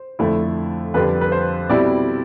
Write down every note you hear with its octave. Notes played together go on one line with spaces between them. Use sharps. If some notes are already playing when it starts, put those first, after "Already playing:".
Already playing: C5
F2 D3 A3 E4
F2 D3 G3 B4
B4
C5
B2 G3 C4 E4 D5